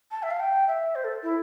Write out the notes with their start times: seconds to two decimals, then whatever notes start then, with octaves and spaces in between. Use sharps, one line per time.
0.11 A5
0.23 E5
0.30 F5
0.40 G5
0.67 E5
0.95 C5
1.04 A4
1.23 E4